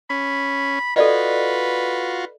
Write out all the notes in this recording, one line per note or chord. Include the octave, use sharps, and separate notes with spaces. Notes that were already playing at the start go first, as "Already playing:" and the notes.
C#4 B5
F4 F#4 A4 B4 D5 D#5